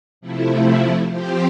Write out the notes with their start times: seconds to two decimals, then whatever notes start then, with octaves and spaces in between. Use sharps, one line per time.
0.21 C3 F3 A3 E4
1.10 F3 C4 G4 C5